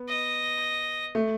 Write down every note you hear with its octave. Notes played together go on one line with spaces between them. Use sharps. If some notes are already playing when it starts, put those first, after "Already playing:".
Already playing: B3
D#5
A3